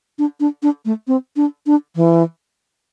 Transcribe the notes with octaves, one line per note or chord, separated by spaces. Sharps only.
D4
D4
D4
A3
C4
D4
D4
E3